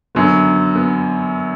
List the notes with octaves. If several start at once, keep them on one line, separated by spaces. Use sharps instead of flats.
F#2 D3 F#3 B3
B3